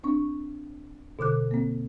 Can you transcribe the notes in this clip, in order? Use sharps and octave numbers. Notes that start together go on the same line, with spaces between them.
C4 D4 C#6
B2 D3 D6 F#6
A#3 C4